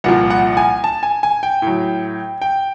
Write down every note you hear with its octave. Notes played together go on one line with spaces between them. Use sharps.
C2 A#2 F3 F#5
F#5
G#5
A5
G#5
G#5
G5
A2 F#3
G5